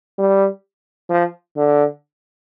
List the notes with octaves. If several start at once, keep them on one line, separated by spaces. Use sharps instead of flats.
G3
F3
D3